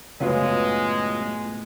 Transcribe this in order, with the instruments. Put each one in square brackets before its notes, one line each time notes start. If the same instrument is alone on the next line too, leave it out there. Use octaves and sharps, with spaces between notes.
[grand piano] C#2 F#2 [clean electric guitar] A2 B3 [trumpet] G#3 [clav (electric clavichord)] C#4 F4 B4